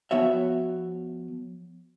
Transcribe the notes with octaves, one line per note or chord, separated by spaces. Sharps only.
F3 B3 F#4 C#5 E5